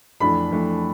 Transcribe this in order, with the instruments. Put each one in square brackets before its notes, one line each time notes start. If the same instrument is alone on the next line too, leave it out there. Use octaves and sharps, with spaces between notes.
[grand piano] F2 E3 A3 D4 [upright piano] B5
[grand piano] F2 E3 A3 D4